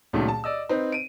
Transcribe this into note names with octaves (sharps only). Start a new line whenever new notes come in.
C#2 A#2 D#3 F#3 A3
A5
D5 D#5 E6
C4 D#4 B4
D7 D#7